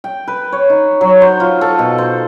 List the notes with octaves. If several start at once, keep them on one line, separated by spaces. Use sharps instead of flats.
G5
B4
C#5
D#4
F#3
C5
F4
A4
B2
C5